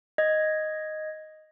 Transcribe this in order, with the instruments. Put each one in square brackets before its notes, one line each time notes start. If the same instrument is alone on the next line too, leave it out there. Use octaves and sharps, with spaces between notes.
[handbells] D#5 G#6